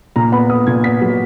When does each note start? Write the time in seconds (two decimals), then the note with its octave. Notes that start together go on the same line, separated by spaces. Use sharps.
0.16 A#2 A#5
0.32 B3 B5
0.50 B3 D#6
0.67 A#2 G#6
0.84 B3 B6
1.01 F#3